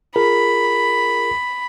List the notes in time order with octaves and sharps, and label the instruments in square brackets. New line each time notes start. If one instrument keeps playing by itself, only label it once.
[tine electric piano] F4 G#4 A#4 [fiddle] B5